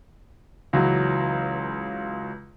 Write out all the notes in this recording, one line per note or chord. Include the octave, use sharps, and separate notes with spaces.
C#2 E3 F#3